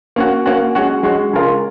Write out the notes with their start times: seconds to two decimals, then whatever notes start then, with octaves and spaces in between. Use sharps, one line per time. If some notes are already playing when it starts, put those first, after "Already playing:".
0.16 A#3 C#4 F#4
0.46 A#3 C#4 F#4
0.75 G#3 C#4 F#4
1.03 G#3 C#4 F#4
1.33 C#3 G#3 C#4 F4 A#4